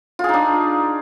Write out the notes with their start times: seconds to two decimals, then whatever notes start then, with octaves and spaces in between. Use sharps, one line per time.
0.19 F4
0.24 G#4
0.29 D#4
0.34 D4